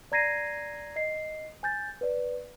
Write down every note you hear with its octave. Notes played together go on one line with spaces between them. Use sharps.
D5 A#5 G#6 A#6 C7 D#7
D#5 C7
G#5 G6 A6
B4 D5